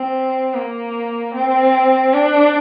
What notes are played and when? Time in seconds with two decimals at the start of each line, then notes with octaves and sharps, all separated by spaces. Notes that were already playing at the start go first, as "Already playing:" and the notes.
Already playing: C4
0.54 A#3
1.34 C4
2.14 D4